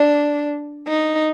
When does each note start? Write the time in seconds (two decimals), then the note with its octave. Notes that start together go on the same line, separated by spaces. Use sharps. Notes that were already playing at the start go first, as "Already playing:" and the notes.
Already playing: D4
0.88 D#4